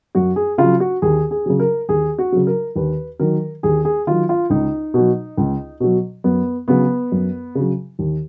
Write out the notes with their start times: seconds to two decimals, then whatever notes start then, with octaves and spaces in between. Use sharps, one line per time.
0.15 F#2 F#4
0.36 G#4
0.58 C#3 F#3 F4
0.80 F#4
1.02 D#2 G#4
1.31 G#4
1.46 C#3 F#3
1.60 A#4
1.89 D#2 G#4
2.19 F#4
2.32 C#3 F#3
2.47 A#4
2.76 D#2 B4
3.19 D#3 F#3 A#4
3.63 D#2 G#4
3.85 G#4
4.07 D#3 F#3 F4
4.29 F4
4.50 C#2 D#4
4.94 B2 F#3
5.37 C#2
5.80 B2 F#3
6.24 F#2 B3
6.68 C#3 F#3 B3
7.12 F#2
7.55 C#3 F#3
7.99 D#2